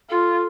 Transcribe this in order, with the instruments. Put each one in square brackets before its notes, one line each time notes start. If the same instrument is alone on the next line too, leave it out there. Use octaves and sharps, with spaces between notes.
[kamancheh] F4 [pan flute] A4